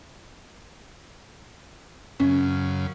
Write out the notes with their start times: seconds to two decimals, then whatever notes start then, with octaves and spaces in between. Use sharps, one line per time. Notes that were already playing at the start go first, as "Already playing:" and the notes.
2.20 F#2 C#3 C#4